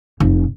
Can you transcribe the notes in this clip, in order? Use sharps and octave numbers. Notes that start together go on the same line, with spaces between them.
F1